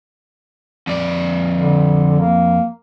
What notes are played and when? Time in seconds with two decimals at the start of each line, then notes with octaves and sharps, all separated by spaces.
0.87 F2 D5
1.58 D3
2.20 A#3